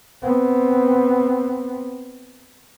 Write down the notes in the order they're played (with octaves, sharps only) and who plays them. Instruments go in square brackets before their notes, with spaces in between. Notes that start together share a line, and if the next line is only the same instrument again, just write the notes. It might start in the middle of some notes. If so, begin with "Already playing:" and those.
[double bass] B3 C4